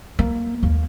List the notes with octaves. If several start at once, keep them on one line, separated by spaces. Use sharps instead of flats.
A#3
D#2 A#3